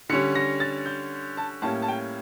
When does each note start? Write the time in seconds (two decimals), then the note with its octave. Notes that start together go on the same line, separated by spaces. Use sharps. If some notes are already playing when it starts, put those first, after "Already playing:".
0.09 D3 G3 C#4 C#7
0.35 A#6
0.60 A6
0.86 G6
1.37 A5
1.62 A2 G3 A#3 C#4 A5
1.82 A5
1.88 G5